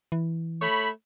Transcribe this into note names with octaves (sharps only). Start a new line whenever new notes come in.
E3
A3 C#5 B5